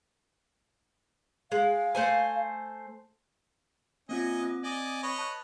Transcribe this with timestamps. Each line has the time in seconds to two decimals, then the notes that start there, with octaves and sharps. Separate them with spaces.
1.52 G#3 F5
1.95 A3 C5 G#5
4.09 A#3 C4 C#4 F4 D#5
4.39 C4 D#6
4.64 D5 D#5 G#5
5.03 B4 C#5 D#5
5.18 A5 F#6